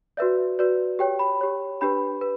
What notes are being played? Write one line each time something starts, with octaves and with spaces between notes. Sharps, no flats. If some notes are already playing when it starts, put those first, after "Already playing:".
F#4 B4 D5 E5
F#4 B4 D5
G4 C#5 G5
B5
G4 C#5
D4 G4 B4 B5
B4